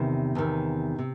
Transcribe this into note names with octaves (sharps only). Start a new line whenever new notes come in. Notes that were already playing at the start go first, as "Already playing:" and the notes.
Already playing: E2 C3 D#3
E2 C3 D#3
C3